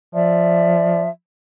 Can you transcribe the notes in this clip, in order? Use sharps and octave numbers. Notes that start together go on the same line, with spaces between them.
F3 D5 E5